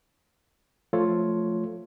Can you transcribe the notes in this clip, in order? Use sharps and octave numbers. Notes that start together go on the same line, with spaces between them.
F3 A3 F4 A4 C#5